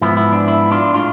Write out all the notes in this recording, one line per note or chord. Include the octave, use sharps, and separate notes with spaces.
G#2 F3 B3 E4
E4
D4
E4
D4 F4
A2 G#3 D4 F4